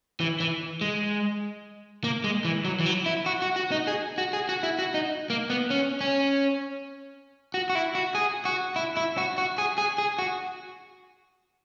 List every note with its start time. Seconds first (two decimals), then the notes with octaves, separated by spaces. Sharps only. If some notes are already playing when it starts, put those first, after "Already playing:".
0.20 E3
0.40 E3
0.81 G#3
2.04 A#3
2.24 G#3
2.45 E3
2.65 F#3
2.80 E3
2.86 F#3
3.06 E4
3.26 F#4
3.42 F#4
3.56 F#4
3.71 D#4
3.87 G#4
4.18 F#4
4.33 G#4
4.49 F#4
4.63 E4
4.79 F#4
4.94 D#4
5.30 A#3
5.50 B3
5.70 C#4
6.01 C#4
7.54 F#4
7.70 F#4
7.75 E4
7.95 F#4
8.15 G#4
8.45 F#4
8.76 E4
8.97 E4
9.18 F#4
9.38 F#4
9.58 G#4
9.78 G#4
9.98 G#4
10.19 F#4